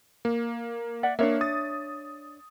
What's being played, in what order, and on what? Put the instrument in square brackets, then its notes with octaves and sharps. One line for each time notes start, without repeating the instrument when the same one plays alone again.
[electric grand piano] A#3
[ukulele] D5 E5 F#5
[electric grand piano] A#3 [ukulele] D4 C#5 E5
[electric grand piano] D#6 A6